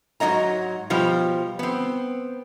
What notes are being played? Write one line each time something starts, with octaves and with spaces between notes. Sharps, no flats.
G#2 F#3 B3 D#5 A#5
B2 F3 G3
B3 C4